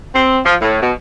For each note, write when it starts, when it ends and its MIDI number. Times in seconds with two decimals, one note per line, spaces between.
0.15 0.39 60
0.45 0.55 53
0.62 0.82 45
0.82 0.93 47